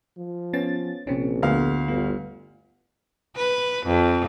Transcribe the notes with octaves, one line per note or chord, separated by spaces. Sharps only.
F3
B3 C#4 A6
A#1 C3 C4 C#4
D2 B3 F4 F5
G1 B3 F4
B4
F2